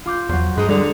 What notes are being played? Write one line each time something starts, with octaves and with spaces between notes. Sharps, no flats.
F4 D6 G6
E2 F#3 C5
G2 G#3 B4 C5 A#5
D3 G3 G#3